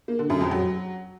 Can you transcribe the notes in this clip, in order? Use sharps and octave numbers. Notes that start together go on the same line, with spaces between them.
A#3
D3
F#2
F2
F#3